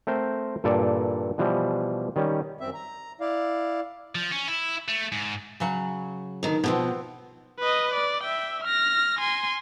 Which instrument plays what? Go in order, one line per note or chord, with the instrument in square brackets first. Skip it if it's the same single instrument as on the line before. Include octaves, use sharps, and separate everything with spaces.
[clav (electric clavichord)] A3 C4 A#4 C5
G2 A#2 E3 A4 D5
B2 E3 F3 G3
D#3 G3 C#4
[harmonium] F#2 C4 E5
A#5
E4 D5 F5
[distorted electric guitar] F3
C#4
E4
A3
G#2
[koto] C#3 F#3 F#5
[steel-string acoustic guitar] D2 D#3
[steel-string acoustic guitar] B2 E3 F3 [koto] B3 C4
[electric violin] B4 D#5
D5
E5 G5
F6 A#6
G#5 C6